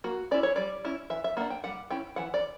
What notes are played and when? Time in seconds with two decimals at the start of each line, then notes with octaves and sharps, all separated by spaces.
0.04 A#3 F#4
0.31 C#4 E4 D5
0.43 C#5
0.56 G3 D5
0.85 C#4 E4
1.10 E3 E5
1.24 E5
1.37 A#3 D4 F#5
1.50 G5
1.64 G3 F#5
1.90 C#4 E4 G5
2.16 E3 F#5
2.34 D5